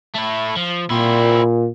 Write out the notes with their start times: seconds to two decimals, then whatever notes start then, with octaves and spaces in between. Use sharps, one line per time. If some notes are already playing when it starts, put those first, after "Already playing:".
0.15 A3 E4
0.56 F3
0.90 A#2 C4 E4